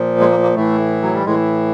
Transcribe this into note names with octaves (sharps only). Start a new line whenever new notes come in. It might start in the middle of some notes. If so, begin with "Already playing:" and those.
Already playing: A#2 F3
G#3
A#3
A#3
A2 E3 A3
F#3
G3
A2 E3 G#3